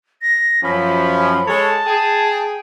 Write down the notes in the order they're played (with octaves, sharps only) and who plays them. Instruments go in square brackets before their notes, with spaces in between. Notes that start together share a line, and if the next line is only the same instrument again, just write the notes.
[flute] A#6
[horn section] F#2 F3 [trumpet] C#4 [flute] B5
[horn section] G#3 A4 C#5 [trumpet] A5
[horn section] G#4 [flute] G5